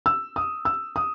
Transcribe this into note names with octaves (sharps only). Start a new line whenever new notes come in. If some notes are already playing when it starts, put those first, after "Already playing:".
E6
D#6
E6
D#6